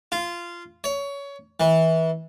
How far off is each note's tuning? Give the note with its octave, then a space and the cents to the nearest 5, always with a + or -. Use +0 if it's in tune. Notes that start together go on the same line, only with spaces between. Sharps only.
F4 -15
C#5 +20
E3 -25